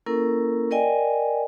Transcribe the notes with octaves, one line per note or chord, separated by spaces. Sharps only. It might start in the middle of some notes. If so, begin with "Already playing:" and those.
A#3 C#4 E4 A4 A#4
A#4 D5 D#5 G5 G#5